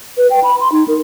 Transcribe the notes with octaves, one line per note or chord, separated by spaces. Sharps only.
B4
G5
B5
C6
D#4
A#4